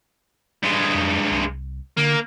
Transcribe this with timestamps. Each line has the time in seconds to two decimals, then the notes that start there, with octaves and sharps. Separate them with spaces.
0.63 G2 G#3
0.94 F2
1.31 C2
1.97 D3 A#3